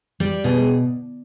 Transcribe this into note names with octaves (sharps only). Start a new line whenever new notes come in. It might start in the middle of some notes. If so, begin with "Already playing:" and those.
G3 D5
B2 G#4